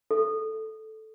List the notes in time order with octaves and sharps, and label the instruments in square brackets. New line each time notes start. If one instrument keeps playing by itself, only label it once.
[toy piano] A4